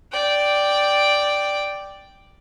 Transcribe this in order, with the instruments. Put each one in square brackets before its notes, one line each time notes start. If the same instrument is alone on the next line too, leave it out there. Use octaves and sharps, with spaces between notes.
[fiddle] D5 G5